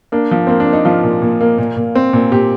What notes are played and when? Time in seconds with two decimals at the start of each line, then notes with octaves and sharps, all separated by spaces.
0.12 A#3 D4
0.31 F3
0.47 A#3 C4
0.60 D4
0.67 A#3
0.73 D#4
0.85 F3 F4
1.03 A#2
1.22 A#2
1.41 A#3
1.58 A#2
1.77 A#2
1.95 C4
2.13 A#2
2.32 A#2 G4